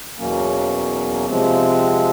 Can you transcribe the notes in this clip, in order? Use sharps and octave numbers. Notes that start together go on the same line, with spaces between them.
E2 B2 F#3 A#3 C#4
C3 F3 G#3 C4